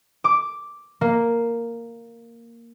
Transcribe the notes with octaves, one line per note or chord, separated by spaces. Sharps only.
D6
A#3